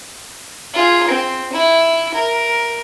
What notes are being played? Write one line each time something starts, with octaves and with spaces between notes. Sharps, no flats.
F4 G#4
C4
E4
A#4